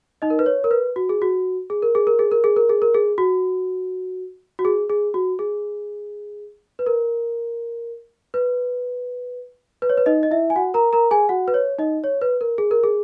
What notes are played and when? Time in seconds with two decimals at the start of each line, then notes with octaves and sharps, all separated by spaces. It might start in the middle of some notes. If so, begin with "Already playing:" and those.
0.22 D#4 D#5
0.30 A#4
0.39 B4
0.46 C#5
0.64 A#4
0.71 B4
0.96 F#4
1.09 G#4
1.22 F#4
1.70 G#4
1.82 A#4
1.95 G#4
2.07 A#4
2.19 G#4
2.32 A#4
2.44 G#4
2.56 A#4
2.69 G#4
2.82 A#4
2.94 G#4
3.18 F#4
4.59 F#4
4.65 G#4
4.90 G#4
5.14 F#4
5.39 G#4
6.79 B4
6.86 A#4
8.34 B4
9.82 B4
9.90 C#5
9.97 B4
10.06 D#4 D#5
10.23 D#5
10.31 E4 E5
10.50 G#5
10.56 F#4 F#5
10.74 A#4 A#5
10.93 A#4 A#5
11.11 G#4 G#5
11.29 F#4 F#5
11.48 B4
11.54 C#5
11.79 D#4 D#5
12.04 C#5
12.21 B4
12.41 A#4
12.58 G#4
12.71 A#4
12.83 G#4